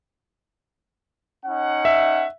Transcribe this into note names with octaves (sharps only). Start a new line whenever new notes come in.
C#4 D#4 F#5
E5